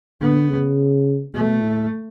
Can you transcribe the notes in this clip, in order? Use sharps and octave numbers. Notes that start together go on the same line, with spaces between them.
D3 B3
C#3
B2 A3
A2